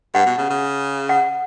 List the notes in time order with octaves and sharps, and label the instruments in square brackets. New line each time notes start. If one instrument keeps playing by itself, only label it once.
[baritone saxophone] G2 [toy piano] F#5
[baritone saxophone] B2
C#3
C#3
[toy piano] F#5